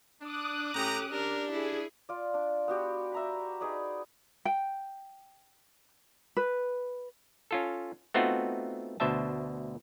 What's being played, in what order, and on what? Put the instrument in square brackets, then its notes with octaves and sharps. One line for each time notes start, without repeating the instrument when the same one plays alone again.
[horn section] D4 [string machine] D6 D#6 F#6
[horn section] A2 G5 A#5 [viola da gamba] C#4 G4 [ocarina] A4
[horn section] D4 [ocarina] G4 [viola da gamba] A#4
[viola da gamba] E4 [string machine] G#4
[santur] F4 D5
D4
B3 F#4 G4
E5 A#5 B5
D#4 G#4 B4 D5
[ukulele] G5
B4
[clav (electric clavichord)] C#4 F4 A4
A3 B3 C4 D#4 F4 F#4
D2 B2 C5 E5 A5